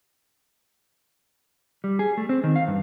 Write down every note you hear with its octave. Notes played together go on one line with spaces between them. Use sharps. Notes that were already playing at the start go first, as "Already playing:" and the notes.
G3
G#4
A3
C4
D#3
F5
G2